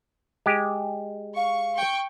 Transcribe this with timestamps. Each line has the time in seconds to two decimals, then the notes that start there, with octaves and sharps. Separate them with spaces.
0.46 G#3 G4
1.36 F5 C#6
1.75 G5 C#6